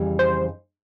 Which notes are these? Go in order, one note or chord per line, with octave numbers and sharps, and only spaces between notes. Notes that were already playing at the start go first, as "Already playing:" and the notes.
Already playing: F2 C#3 E3 G3 C#4
C5